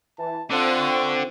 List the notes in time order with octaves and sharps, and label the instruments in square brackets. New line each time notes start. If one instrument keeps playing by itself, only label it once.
[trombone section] E3 [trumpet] A5
[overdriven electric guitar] D3 [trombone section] C4 [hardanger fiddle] F4 F#5 [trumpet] A4
[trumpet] C#6